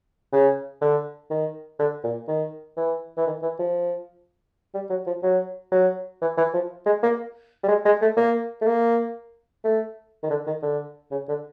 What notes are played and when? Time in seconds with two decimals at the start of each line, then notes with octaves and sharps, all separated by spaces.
0.32 C#3
0.81 D3
1.30 D#3
1.79 D3
2.04 A#2
2.28 D#3
2.77 E3
3.17 E3
3.26 D#3
3.42 E3
3.59 F3
4.74 G3
4.90 F#3
5.06 F3
5.22 F#3
5.72 F#3
6.21 E3
6.37 E3
6.53 F3
6.86 G#3
7.03 A#3
7.63 G3
7.68 G#3
7.85 G#3
8.01 A3
8.17 A#3
8.61 A3
8.67 A#3
9.64 A3
10.23 D#3
10.30 D3
10.46 D#3
10.62 D3
11.11 C#3
11.28 D3